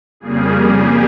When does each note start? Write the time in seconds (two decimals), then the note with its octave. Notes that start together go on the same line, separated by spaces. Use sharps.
0.20 F2 C#3 G3 A#3 G#4
0.75 G4